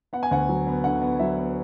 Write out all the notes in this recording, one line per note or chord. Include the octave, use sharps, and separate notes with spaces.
B3 F#5
G#5
D2 F#5
F#3
B3
D3 F#5
B3
F#3 E5
B3